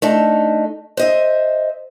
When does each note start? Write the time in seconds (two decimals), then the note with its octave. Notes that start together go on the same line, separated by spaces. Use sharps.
0.02 A3 D4 D#4
0.97 C5 D#5 E5